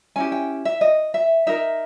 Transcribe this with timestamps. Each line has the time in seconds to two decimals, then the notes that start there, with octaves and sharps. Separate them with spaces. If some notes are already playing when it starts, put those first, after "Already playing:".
0.16 C#4 E4 G4 G#5
0.32 G5
0.65 E5
0.81 D#5
1.14 E5
1.47 D#4 A#4 E5